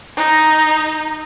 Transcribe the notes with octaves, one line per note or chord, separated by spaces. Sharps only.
D#4